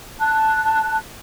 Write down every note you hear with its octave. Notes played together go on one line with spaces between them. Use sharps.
A5 F#6